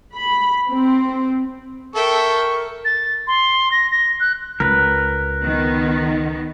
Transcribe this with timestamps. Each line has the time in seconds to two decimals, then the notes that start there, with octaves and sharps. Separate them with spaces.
0.15 B5
0.69 C4
1.95 A4 A#4 E5 G5 C#6
2.85 A6
3.27 C6
3.72 A#6
3.91 A#6
4.20 F#6
4.60 C#2 A#4 B4
5.42 D#3 B3